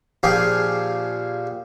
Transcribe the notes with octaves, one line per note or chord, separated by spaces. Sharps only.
A#1 F3 G4 G#4 F5